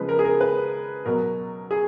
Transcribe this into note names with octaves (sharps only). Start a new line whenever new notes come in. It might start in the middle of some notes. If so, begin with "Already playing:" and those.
Already playing: C#3 F3 G#3 B4
A#4
G#4
A#4
B4
B2 F#3 A#4
G#4